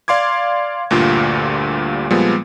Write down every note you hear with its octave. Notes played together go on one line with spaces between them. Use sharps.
D5 F5 C6 D6 G#6
D2 G2 A#2 F4 G4
A#2 F3 G3 G#3 B3